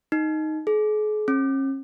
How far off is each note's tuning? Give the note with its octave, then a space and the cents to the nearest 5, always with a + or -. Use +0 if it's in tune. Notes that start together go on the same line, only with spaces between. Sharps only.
D#4 +0
G#4 +40
C#4 -40